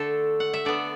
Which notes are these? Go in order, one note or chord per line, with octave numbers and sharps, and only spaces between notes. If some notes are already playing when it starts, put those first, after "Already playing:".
Already playing: D3 A3 A4
F#5
E5
D3 B3 D5